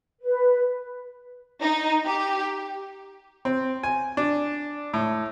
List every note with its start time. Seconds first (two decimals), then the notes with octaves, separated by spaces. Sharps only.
0.21 B4
1.63 D#4
2.05 G4
3.45 C4
3.83 G#5
4.17 D4
4.94 A2